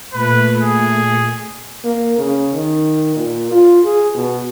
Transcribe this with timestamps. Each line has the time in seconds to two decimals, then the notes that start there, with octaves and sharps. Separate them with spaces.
0.13 A#2 A3 B4
0.62 G#4
1.84 A#3
2.19 C#3
2.54 D#3
3.16 A#2
3.51 F4
3.85 G#4
4.16 B2